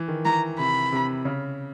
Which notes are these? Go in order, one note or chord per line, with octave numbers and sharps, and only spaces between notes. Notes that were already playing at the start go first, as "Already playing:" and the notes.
Already playing: E3
D#3
E3 A#5
C3 B5
C3
C#3